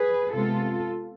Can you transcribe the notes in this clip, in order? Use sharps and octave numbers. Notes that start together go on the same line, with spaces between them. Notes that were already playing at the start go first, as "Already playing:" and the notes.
Already playing: G#4 B4
C3 G#3 B3 F4 A4